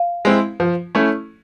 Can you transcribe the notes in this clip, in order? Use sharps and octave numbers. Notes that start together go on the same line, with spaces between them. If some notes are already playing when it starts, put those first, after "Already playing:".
Already playing: F5
G#3 C4 E4
F3
A3 C#4 E4